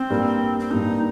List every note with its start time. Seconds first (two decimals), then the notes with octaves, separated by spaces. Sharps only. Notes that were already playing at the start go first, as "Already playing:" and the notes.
Already playing: C4
0.10 G2 G3 A#3
0.60 C4
0.71 G2 G3 A#3 D#4